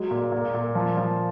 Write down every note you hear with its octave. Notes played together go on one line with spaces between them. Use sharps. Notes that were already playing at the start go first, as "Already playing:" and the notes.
Already playing: F#3 G#3
A#2
A#2
A#2
F3
F3